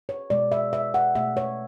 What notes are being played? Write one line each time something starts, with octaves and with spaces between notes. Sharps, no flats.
C#5
B2 G#3 D5
E5
E5
F#5
B2 A3 E5
C#5